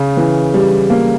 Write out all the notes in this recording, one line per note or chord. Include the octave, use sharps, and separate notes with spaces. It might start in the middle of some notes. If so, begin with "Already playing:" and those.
Already playing: C#3
E3
G3
A#3